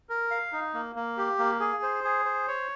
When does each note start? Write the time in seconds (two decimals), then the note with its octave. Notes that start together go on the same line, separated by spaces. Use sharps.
0.09 A#4
0.31 F5
0.53 D#4
0.74 A#3
0.96 A#3
1.17 G4
1.39 A#3
1.60 G#4
1.83 C5
2.04 G#4
2.25 C5
2.48 C#5